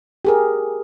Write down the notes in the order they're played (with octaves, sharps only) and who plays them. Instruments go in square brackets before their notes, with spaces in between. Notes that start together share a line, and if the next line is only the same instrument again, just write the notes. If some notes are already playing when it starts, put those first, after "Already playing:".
[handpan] G4 G#4 A#4